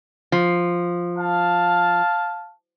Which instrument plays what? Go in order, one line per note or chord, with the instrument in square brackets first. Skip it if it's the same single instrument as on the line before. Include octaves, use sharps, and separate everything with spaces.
[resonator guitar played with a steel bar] F3
[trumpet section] F5 A5